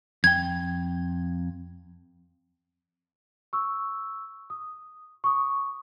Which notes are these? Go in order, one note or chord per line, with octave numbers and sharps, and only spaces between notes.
F2 G5 G#6
C#6 E6
D#6
C#6 D#6